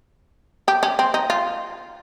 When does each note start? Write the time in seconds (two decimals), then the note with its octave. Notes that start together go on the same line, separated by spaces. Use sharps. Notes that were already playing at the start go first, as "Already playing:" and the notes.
0.68 G4
0.83 C#4
0.99 C4
1.14 D#4
1.30 F4